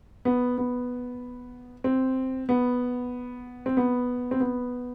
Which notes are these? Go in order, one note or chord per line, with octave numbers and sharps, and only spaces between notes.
B3
B3
C4
B3
C4
B3
C4
B3